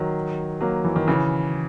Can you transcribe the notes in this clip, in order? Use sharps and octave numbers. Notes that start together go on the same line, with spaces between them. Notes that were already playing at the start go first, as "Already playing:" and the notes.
Already playing: D#3 F#3
F#3 A#3
E3
D#3
C#3 E3